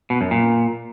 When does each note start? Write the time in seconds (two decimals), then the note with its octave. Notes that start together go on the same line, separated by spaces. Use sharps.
0.10 B2
0.21 F#2
0.31 A#2